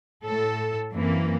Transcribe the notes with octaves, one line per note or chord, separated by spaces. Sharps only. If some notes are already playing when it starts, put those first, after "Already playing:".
A2 A4
F#2 E3 A#3 C4